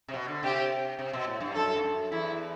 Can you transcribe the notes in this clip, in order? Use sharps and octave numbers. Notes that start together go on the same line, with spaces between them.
C3
B2
D3
C3 G4
C3
B2
A2
G2
F#2 A4
G2
F#2
E2 E4